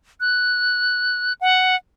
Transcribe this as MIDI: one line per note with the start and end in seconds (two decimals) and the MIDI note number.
0.20 1.33 90
1.41 1.76 78